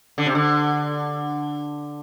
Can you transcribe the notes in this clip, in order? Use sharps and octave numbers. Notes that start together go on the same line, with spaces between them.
D3
C3
D3